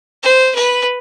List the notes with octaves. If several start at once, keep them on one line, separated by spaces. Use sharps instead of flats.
C5
B4